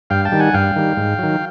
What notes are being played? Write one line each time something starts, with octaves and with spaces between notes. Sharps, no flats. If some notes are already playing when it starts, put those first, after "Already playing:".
G2 F5 G5
G5 A5
D#3 G3
F#5 G#5
G2 F5 G5
D#3 G3
G#2
D#3 F#3